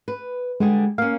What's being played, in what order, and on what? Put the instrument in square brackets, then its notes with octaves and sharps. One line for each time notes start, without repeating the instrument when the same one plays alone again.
[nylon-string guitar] B4
[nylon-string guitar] D3 G3 G#4 [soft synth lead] G#3
[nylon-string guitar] A#3 C#4 [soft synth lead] F5